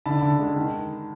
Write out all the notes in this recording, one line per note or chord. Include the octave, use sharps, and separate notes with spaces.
D3 A5 B5
D3
G#3
D#3